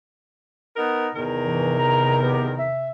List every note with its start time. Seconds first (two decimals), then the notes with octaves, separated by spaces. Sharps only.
0.76 B3 D#4 A#4
1.14 E2 C3 D#3 A#4
1.45 G2 E3
1.79 A#5
2.22 B3 G4
2.59 E5